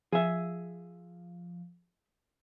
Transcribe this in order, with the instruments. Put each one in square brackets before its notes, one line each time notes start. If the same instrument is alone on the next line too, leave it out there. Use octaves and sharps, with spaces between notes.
[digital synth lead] F3 [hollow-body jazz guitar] G#4 E5